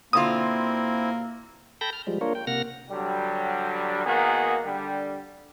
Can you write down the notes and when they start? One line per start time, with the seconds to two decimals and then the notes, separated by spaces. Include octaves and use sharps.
0.13 B2 D3 A#3 C4 E4 F4 D#6
1.81 A4 G5 A5 B5 G6 A#6
1.93 F6
2.07 F3 G3 G#3
2.21 A#3 D4 F4 A#4 C#5
2.35 G5
2.47 C3 A#3 F#5 F6 A#6
2.90 D3 F#3 G3
4.06 D#3 A#3 B3 F#4 G#4
4.64 D3 G3